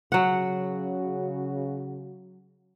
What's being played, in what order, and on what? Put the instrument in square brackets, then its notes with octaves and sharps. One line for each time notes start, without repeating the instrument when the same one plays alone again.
[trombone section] C#3 F#4 [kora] F#3 F#5